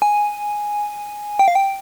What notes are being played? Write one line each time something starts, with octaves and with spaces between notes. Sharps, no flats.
G#5
G5
F5
G5